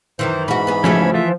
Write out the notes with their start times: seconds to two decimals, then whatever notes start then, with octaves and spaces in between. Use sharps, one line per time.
0.19 F#2 D#3 E3 C5
0.48 G#2 E3 C#4 F#4 B5
0.67 B3 G#4
0.84 C#3 F3 A3 C#4 E4 F#4 A4
1.14 E3 F4 E5